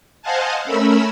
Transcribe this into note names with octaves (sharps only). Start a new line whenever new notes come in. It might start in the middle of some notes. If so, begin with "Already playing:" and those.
C5 D#5 F5 F#5 G#5 A5
A3 C#4 A#4 B5 E6